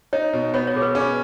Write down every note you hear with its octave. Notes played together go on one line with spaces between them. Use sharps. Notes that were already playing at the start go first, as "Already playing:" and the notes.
D#4 C#5
B2
B3 C#5
C#5
B2 G#4
B4
C#4 G#4